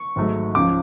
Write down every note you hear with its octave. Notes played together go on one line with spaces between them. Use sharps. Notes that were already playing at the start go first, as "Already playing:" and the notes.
Already playing: C#6
G#1 G#2 F#3 A3
C#2 C#3 F3 D6